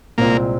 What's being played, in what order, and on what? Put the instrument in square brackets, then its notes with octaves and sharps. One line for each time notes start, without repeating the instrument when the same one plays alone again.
[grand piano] C2 A#2 G#3 C4 F4 [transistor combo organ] A#3